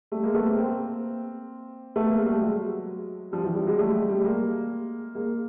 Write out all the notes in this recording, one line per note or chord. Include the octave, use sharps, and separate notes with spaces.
G3 A3
G#3 A#3
A3 B3
A#3 C4
A#3 C4
A3 B3
G#3 A#3
G3 A3
F#3 G#3
F3 G3
E3 F#3
F3 G3
F#3 G#3
G3 A3
F#3 G#3
G3 A3
G#3 A#3
G#3 A#3